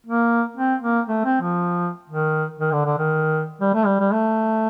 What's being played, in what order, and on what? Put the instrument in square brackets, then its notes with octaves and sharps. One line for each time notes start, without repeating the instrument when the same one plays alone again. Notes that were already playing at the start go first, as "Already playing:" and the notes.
[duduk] A#3
C4
A#3
A3
C4
F3
D#3
D#3
D3
D3
D#3
G3
A3
G3
G3
A3